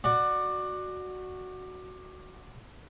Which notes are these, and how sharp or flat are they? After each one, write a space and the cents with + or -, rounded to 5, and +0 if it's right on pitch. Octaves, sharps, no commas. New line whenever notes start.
F#4 +0 D5 +20